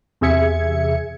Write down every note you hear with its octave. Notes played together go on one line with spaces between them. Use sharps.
E2 C3 G#4 E5 G#6 C#7